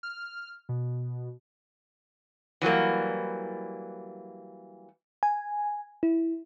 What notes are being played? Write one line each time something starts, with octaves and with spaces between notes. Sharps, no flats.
F6
B2
E3 F#3 G3 A#3
G#5
E4